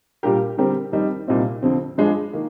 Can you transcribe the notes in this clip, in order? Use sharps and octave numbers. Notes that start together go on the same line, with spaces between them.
A#2 G3 D4 G4 A#4
D3 G3 C4 G4 A#4
F2 D#3 G3 C4 D#4
C2 A#2 G3 C4 D#4
F2 D3 F3 C4
G2 F3 G#3 D4 G#4
D#3 A#3